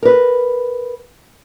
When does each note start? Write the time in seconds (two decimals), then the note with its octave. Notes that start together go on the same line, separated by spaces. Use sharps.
0.03 A#4 B4